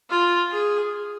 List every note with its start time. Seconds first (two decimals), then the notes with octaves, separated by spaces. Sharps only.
0.10 F4
0.51 G#4